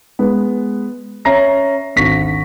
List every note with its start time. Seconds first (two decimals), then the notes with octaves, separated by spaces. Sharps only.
0.19 G#3 B3
1.25 C#4 E5 A#5 A#6 C7
1.96 G#1 D2 D3 C#6 A#6 B6